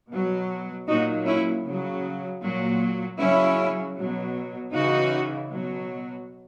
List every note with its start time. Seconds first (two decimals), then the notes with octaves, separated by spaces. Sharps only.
0.11 B2 F#3
0.88 A#2 F#3 D#4 F#4
1.26 C#4 E4
1.65 C#3 F#3
2.42 A#2 F#3
3.19 C#3 F#3 C#4 E4
3.96 B2 F#3
4.72 C#3 E3 D#4 F#4
5.50 B2 F#3